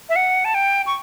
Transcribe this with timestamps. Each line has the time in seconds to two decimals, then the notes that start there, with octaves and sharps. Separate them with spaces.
0.09 E5
0.16 F#5
0.45 A5
0.55 G5
0.86 C#6